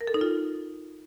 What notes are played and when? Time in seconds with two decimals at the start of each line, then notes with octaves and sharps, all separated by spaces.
0.01 A#4
0.07 A4
0.14 D#4
0.21 F4